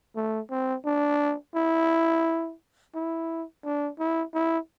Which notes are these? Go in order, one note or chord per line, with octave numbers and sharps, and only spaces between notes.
A3
C4
D4
E4
E4
D4
E4
E4